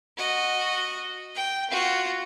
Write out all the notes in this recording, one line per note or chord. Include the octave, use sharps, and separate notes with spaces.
F#4 D#5
G5
F4 F#4